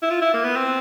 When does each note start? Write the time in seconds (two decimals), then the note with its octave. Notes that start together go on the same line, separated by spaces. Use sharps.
0.02 E4
0.10 F4
0.22 E4
0.34 A#3
0.44 B3
0.56 C4